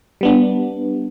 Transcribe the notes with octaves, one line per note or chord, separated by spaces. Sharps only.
G3 B3 D4